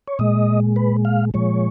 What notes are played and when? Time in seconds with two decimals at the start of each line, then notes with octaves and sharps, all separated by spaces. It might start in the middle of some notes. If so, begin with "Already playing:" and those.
0.08 C#5
0.19 A#2 G#3 D#5
0.76 B4
1.05 F5
1.34 A#2 F3 G#3 C#5